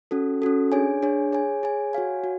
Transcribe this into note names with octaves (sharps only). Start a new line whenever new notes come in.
C#4 F#4 A4
C#4 F#4 A4
D4 G#4 C#5 G#5
D4 G#4 C#5 G#5
G#4 C#5 G#5
G#4 C#5 G#5
F#4 C#5 F5 G#5
F#4